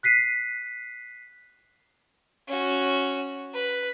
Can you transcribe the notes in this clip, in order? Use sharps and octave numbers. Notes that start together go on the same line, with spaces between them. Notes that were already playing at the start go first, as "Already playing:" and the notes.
F#6 B6 C7 D#7
C#4 F#4
B4